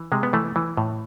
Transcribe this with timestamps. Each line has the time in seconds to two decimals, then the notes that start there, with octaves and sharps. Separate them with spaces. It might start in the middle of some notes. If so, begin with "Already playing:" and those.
Already playing: E3
0.12 C3 G#3
0.23 B3
0.33 E3 A3
0.56 E3
0.77 A2